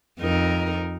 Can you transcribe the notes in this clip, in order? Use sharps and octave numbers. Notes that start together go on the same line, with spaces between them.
F2 D#4 A#4